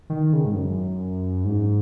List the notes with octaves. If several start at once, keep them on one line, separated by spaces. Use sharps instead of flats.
D#3
C#3
G#2
F#2
G#2